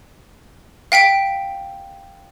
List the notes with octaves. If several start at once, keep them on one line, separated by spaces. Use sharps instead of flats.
F5 G5 B6 D7